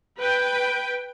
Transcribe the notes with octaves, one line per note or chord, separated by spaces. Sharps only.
B4 G5